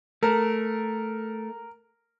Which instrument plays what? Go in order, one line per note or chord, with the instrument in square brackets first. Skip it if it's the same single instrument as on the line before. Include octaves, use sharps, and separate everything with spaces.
[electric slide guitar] A3 [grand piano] A#4